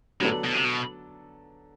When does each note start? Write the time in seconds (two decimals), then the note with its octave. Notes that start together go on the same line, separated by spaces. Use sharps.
0.20 A2 D3 F#3 B3 D4 A4
0.44 B2
0.54 C3
0.65 B2